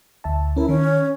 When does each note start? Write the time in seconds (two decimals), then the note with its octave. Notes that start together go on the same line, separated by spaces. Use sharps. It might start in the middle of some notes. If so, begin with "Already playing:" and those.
0.24 D2 E5 A5
0.57 C#4 E4 A#4
0.69 D#3 C#4